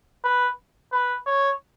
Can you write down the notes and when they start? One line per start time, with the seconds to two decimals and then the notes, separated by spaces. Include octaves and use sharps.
0.24 B4
0.92 B4
1.27 C#5